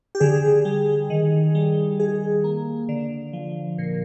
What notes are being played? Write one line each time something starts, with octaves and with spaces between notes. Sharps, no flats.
G4
D3 G#4
G3
D#3
G3
D#3 G#4
A#3
D3
F3
A#2